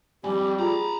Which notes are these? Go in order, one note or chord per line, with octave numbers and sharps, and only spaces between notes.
F2 G#2 G3 G4 G#5 B5
F4 G#4 A#5 B5